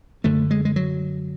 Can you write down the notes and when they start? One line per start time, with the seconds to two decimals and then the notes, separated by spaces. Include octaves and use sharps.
0.24 F#2 D3 A3
0.51 G#3
0.65 G#3
0.76 F#3